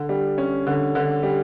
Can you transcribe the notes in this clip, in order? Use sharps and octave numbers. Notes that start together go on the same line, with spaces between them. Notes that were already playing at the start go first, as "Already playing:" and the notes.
Already playing: D3
G3
C#4
D3
D3
G3